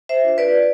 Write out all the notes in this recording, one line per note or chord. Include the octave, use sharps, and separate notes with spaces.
C5 E5
D4 F4
B4 D5